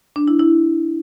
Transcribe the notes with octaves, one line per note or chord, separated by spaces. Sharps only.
D4
E4
E4